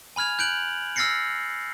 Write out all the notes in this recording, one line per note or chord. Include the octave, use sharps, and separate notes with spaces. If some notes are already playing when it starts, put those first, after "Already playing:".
G#5 B5 F6 G#6 F7
F#6 G6 D7 F#7
E6 F6 A6 A#6 C7 C#7